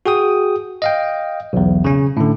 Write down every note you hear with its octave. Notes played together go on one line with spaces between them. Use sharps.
F#4 G#4 G5 D#6
D#5 F5 G5
B1 E2
C#3 C#4
A2 D3